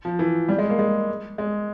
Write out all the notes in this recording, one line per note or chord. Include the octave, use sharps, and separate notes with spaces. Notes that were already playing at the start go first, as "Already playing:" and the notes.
F3
E3
G3
G#3
A#3
G#3
G#3